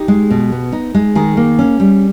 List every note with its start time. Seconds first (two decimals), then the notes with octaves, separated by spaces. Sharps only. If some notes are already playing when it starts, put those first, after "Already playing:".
Already playing: D#4 G4
0.08 G#3
0.31 B2
0.52 B3
0.72 D#4
0.95 G#3
1.15 D#3 G#4
1.37 A#3
1.59 C#4
1.80 G3